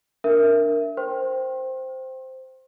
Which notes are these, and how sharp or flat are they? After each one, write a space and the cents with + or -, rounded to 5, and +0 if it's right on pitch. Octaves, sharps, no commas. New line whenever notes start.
D4 +0 A#4 +0 E5 +5
C5 -5 G5 -10 C6 +40